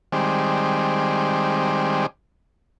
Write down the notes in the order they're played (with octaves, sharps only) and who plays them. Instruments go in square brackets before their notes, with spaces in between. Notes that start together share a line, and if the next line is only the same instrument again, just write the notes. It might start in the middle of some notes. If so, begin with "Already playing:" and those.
[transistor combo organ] D#3 G3 G#3 C4 D5